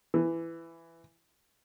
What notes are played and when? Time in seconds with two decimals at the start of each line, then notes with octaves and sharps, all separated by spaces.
0.14 E3